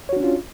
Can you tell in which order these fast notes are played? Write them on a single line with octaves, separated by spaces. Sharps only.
C#5 F#4 D4 C#4 F4